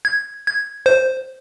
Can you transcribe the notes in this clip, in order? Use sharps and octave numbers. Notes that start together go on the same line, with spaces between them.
G#6
G#6
C5